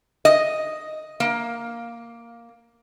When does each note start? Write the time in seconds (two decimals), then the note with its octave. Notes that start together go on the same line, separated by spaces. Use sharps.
0.25 D#5
1.20 A#3